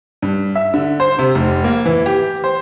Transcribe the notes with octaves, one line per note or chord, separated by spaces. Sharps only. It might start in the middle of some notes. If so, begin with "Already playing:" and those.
G2
E5
D3
C5
C3
F1
A#3
E3
G4
C5